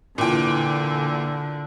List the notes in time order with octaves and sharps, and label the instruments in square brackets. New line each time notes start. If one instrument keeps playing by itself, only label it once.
[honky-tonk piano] A#2 E3 G5 [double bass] D3